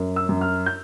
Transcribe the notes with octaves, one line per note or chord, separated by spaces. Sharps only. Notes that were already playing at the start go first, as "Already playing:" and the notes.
Already playing: F#2
E6
F#2
F6
G6